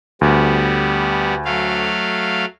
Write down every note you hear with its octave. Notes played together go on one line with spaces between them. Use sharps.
D2 G3 B3
F#3 A3 F5